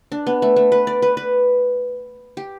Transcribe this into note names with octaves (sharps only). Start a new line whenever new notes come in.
D4
B3
A3
A3
B4
D5
B4
B4
G4